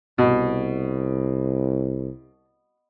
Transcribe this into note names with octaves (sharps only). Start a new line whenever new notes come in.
C2 B2